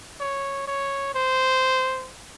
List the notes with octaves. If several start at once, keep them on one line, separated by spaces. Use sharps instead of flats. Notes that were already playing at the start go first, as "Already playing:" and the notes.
C#5
C#5
C5